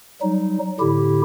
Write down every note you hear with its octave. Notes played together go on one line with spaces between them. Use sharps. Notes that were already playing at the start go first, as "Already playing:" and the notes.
F#3 G3 D#4
A2 D3 E4 G4